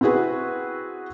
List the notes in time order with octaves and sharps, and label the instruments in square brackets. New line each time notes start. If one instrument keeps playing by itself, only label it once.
[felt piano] C4 E4 F#4 G#4 B4